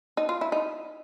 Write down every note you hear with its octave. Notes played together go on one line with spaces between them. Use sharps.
D#4
F4
E4
D#4